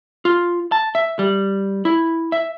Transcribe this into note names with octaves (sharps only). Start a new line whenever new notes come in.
F4
A5
E5
G3
E4
E5